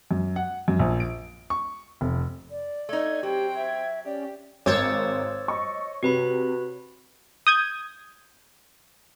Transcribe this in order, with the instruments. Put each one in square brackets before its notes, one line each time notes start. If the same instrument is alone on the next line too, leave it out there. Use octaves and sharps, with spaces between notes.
[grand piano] F#2
F#5
F#2
A#1
D7
C#6
F1
[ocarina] D5
[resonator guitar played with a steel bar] A3 D#4 [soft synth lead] G#6
[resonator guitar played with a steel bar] F#3 [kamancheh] C4 G5 [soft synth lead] G4
[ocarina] E5 [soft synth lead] G#6
[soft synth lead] C#4 [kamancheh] G4 [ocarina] D5
[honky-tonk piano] G#1 A#4 [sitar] C5 C#5 [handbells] D6 E6 A6
[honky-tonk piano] D#5 C#6
[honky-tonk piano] C3 [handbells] F#4 B4 B5
[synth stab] D#6 G6 G#6